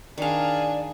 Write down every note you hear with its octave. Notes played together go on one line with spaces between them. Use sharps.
D#3 D4 G#4 D5 F5